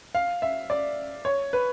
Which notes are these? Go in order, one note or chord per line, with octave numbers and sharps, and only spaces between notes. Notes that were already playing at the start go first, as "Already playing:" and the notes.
F5
E5
D5
C#5
B4